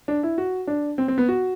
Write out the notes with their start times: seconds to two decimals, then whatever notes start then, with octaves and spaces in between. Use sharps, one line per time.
0.08 D4
0.23 E4
0.38 F#4
0.67 D4
0.98 C4
1.08 C4
1.18 B3
1.28 F#4